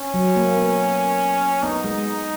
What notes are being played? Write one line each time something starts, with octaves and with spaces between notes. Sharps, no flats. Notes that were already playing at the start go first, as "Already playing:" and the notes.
Already playing: C#4
F#3
A#3
B3
B3 D#4
G#3